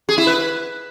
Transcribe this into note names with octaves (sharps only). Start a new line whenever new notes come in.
G#4
E4
B4